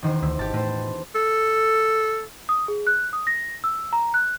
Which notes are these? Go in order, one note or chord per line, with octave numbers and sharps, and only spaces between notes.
E1 D#3 C5
D2 E6
G#1 G4 A5
A2 B4 C5
A4
D#6
G#4
F#6
D#6
A#6
E6
A#5
F#6